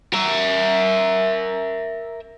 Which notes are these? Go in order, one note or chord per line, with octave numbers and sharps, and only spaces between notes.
A#4 E5